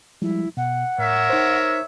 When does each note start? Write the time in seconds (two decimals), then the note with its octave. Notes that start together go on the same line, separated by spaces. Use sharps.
0.22 F3 G3 G#3 E4
0.57 B2 F#5
0.98 A2 A#4 C#5 E5
1.30 D#4 C5